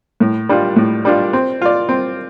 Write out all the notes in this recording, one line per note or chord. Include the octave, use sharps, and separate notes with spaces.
A2
G3 D4 F4
A2
G3 D4 F4
C4
F4 D5
C4